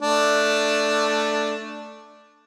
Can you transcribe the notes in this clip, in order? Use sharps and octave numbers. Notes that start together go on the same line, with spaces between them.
A3 D4